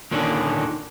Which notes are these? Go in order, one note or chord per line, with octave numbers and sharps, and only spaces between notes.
D#2 A#2 D3 D#3 C#4 D4